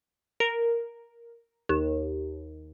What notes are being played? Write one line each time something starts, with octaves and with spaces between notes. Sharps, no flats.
A#4
D#2